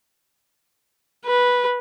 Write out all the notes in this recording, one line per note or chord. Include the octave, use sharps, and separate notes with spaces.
B4